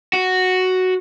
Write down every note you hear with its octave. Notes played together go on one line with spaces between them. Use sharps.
F#4